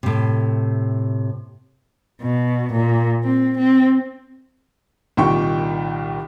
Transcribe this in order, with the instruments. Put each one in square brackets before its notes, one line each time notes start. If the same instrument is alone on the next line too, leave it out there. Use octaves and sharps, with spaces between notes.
[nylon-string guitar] A2 C3
[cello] B2
A#2
C4
C4
[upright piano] C2 A#2 D#3 G5 C#6